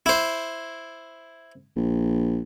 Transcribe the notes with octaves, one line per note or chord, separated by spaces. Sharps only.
E4 C5
A#1